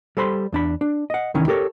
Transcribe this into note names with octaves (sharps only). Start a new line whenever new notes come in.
G3 A4 C5 B5 C6
E2 D4 B5
D4
D#5 F#5
C2 D#3 E3 C#4
G4 A4 A#4 C#5